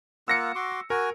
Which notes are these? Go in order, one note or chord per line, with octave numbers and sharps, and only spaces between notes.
A#3 F4 F#5 E6 A#6 C#7
F#4 C6 D6
F#4 A#4 G#5